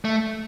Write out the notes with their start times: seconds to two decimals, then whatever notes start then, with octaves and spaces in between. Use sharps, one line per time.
0.05 A3